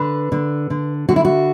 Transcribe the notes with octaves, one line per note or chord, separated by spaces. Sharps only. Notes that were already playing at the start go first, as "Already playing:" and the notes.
Already playing: D3 B4
D3
D3
D3 F#4
E4
F#4